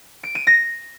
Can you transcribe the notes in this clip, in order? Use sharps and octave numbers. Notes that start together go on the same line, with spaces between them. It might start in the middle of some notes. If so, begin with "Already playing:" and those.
D7
D#7
A#6